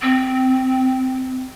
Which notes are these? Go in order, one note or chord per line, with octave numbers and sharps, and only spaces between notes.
C4